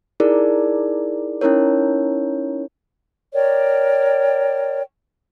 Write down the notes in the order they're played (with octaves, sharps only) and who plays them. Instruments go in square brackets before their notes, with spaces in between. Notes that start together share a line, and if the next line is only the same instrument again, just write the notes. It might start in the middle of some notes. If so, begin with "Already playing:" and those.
[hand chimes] D#4 E4 G#4 A#4 D5
C#4 D#4 E4 A#4 C#5
[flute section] A#4 C#5 D5 G5